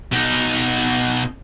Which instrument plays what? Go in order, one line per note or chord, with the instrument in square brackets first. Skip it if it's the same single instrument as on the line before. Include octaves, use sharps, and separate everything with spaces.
[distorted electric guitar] B2 D#4